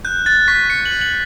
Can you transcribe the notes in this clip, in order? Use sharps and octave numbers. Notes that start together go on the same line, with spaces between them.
F#6 G6
F#6 A6
C#6 B6
C#6 C#7
F#7
F#6
F#7